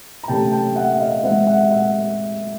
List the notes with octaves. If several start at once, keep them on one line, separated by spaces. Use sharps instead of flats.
A#5
C3 E3 A3 C#4 G5 A5
G5 A5
E5 F#5
D#5 F5
E3 G#3 C4 E5 F#5
E5 F#5
E5 F#5